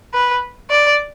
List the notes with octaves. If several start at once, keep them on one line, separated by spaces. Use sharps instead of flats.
B4
D5